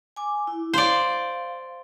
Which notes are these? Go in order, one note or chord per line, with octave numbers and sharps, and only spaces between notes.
G#5 D6
E4
C5 D5 F5